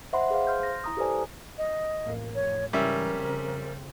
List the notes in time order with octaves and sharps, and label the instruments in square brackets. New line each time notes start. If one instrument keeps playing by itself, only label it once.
[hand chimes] C5 D#5 E5 F#5 B5 C6
G#4 B4 C5 F5
C6 F6 G6
A#6
E4 A#5 D#6
G4 A4 B4 C5 D5 G#5
[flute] D#5
[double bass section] A1 F2 A#3
[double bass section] F2 A2 [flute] C#5
[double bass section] G#2 C#3 E3 [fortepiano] G3 C#4 E5 [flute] A#4
[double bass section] F2 C#3 C4